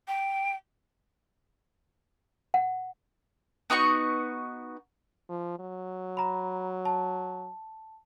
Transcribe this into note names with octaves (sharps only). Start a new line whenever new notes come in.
G5
F#5
B3 D#4 F#4 C#6
F3
F#3
A#5 B5
A5